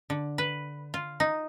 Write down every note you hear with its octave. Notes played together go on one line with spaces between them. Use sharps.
D3
B4
F4
D#4